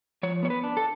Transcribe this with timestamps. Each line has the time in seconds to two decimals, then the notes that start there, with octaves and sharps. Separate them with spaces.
0.23 F3 C#5
0.43 B3 C#5
0.50 B4
0.63 D4
0.77 A4